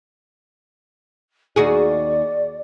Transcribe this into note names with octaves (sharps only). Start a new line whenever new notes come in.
D#2 F#4 G#4 D5